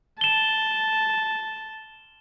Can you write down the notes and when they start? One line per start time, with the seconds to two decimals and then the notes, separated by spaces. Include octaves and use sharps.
0.21 A5 E7 G7